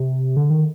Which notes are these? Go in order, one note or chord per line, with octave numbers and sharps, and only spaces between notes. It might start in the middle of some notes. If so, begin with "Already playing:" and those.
Already playing: C3
D3
D#3